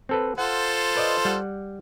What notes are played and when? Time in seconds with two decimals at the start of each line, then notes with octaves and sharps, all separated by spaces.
0.09 C4 A4 B4
0.38 F4 A4 C5 F#5
0.95 B4 D5 D#5
1.25 G3 F#5